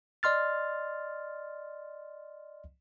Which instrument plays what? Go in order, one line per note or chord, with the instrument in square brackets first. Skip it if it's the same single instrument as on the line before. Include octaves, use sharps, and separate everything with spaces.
[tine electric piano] D5 D#5 C6 F6 A6